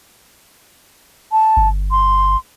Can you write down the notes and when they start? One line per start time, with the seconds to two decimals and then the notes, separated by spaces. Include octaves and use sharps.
1.32 A5
1.57 G1
1.91 C6